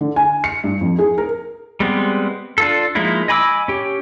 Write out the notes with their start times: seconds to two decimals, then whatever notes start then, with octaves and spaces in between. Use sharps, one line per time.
0.01 D3
0.16 G#5
0.44 C#7
0.64 G2
0.81 F2
0.99 G#4
1.18 A#4
1.80 G3 G#3 B3 C4
2.58 D4 F4 A4
2.95 F3 G#3 A#3 D#4 E4
3.28 D#5 G#5 B5 D6 E6
3.68 C#4 G4